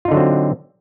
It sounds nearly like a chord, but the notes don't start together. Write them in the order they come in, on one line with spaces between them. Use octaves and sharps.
F4 D#4 D3 F#3 C4